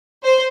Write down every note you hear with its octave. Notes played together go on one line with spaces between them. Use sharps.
C5